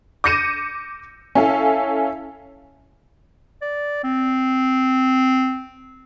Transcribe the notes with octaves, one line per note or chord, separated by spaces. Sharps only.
D6 G6 A#6 C#7 D#7 E7
C#4 E4 A4 F5
D5
C4